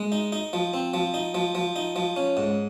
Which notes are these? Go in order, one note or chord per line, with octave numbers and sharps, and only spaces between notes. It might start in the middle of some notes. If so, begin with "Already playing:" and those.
Already playing: G#3
D#4
D#4
F3
C4
F3
D#4
F3
F3
D#4
F3
C#4
G#2